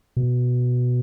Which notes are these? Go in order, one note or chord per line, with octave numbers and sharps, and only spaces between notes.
B2